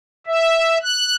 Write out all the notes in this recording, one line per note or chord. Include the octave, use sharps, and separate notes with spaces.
E5
F#6